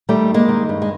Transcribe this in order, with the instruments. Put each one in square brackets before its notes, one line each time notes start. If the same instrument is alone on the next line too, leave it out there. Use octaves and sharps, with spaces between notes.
[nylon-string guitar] D#3 G3 A3
G2
G#3 A#3
D#3
G2
G#3